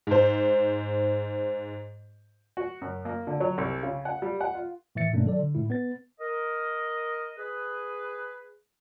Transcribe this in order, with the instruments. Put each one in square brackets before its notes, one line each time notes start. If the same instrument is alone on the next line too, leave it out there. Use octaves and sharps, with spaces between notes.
[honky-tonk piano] G#2 C5
[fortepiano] F#4
F#2
A#3
D3
F#3
C2
C#3
F#5
G3
F#5
F4
[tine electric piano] A2 D#3 E3 E5 A6 C#7
G2 B2 A3 A#3 C#4 D4
D#3 F#3 A4 D5
D3
A2 G#3 E4
B3 B4 A6
[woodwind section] A#4 D#5
G#4 B4